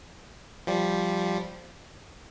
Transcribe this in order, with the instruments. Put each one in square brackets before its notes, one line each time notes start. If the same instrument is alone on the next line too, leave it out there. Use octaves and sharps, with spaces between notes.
[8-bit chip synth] F3 G3